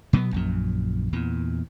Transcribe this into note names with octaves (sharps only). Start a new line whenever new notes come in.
B2 F#3 G#3 B3
A#1 F#2 A#2
E2 A#2